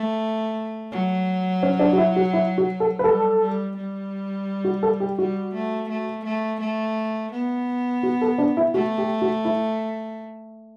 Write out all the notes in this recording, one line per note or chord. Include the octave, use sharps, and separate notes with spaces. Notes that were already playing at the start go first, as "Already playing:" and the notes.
Already playing: A3
F#3
C#4
D4
F#4
E4
F#4
E4
F#4
A4
B4
G3 A4
G3
G3
F#4
A4
G4
G3 F#4
A3
A3
A3
A3
B3
F#4
A4
D4
E4
A3 F#4
G4
F#4
E4